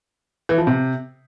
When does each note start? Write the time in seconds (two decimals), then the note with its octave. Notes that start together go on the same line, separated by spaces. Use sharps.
0.49 E3
0.58 F3
0.67 C3